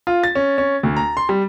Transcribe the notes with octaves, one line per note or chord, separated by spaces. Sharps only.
F4
A6
C#4
C#4
D2
A#5
C6
G3